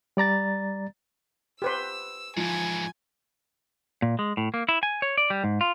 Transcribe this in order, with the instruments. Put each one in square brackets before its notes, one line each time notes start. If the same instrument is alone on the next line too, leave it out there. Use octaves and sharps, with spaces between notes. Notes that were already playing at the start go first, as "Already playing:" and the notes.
[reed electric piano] G3 D5 A#5 A6
[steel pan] G4 B4 C5 [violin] E6
[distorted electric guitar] G#2 E3 [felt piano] F3 [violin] G#5
[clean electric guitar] A#2
G#3
A2
A#3
E4
G#5
C#5
D5
G3
G#2
F4